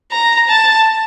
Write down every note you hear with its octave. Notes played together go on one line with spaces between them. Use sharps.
A#5
A5